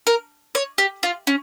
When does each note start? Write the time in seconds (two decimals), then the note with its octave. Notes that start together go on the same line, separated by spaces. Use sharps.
0.07 A#4
0.55 C#5
0.78 G4
1.03 F4
1.27 C#4